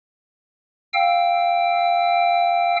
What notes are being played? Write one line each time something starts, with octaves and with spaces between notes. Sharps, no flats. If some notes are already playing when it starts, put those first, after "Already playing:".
F5 G5 E6